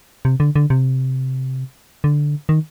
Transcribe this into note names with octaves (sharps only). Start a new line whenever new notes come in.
C3
D3
D3
C3
D3
D#3